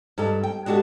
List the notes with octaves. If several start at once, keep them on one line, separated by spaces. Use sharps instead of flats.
G2 D#4 A4
G5
G#3 D4 F#4 G4 A4